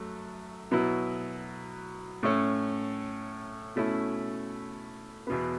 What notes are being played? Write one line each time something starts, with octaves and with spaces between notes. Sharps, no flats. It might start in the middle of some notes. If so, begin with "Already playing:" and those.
Already playing: F#2 F#3 A3
B2 F#3 B3 E4
A2 A3 C#4
B2 A3 C#4 E4
E2 B2 B3